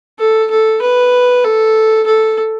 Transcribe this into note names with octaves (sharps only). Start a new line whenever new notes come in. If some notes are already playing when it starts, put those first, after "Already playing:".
A4
A4
B4
A4
A4